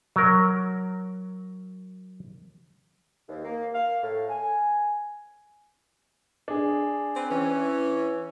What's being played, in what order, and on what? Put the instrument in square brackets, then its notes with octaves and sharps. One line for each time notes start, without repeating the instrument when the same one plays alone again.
[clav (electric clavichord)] F#3 A#4
[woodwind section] D#2
A#3
F5
A2
G#5
[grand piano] D4 G#4
[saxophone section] C4 B4
E3 C#4